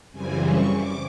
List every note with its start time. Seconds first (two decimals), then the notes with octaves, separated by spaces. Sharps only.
0.12 F#2 C#3 E3 G3 C4 G#5
0.42 C#6
0.72 D6